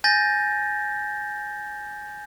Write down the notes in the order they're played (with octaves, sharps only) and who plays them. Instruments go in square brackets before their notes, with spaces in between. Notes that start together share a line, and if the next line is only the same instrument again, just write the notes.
[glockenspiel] G#5 G6 A6 A#6